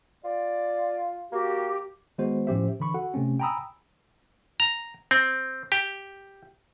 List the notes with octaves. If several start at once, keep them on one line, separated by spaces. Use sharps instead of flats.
F4 D5
A#3 F#4 G4
D#3 G#3 B3 F#4 C5
A2 F3 C#4 G4 C5 E5
D3 E3 B5 C#6
F#4 A4 F#5
C3 A3 C4 C#4
G5 G#5 A#5 B5 D#6 E6
A#5
C4
G4